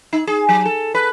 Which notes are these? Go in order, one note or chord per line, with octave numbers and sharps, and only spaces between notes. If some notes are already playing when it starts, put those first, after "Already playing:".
D#4
G#4
F#3
A4
B4